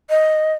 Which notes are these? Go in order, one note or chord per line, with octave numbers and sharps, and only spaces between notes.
D#5